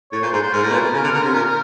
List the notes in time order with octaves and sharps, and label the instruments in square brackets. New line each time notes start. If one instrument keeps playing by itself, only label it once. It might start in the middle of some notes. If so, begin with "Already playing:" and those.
[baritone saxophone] A2 [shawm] C#5
[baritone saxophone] A#2 [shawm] C5
[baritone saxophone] G#2 [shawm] C5
[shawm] C5
[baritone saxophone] G#2 [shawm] A#4
[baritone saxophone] A2
B2
A#2
B2
C#3
D3
D3
C3
A#2